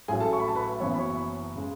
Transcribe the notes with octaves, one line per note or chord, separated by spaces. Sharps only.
A1 A2 F#3 G#4 G#5
A4 A5
C#6
B5
A5
B4 B5
F#1 F#2 E3 B3 C#5 C#6
B5
C#5 C#6
C#3 G#3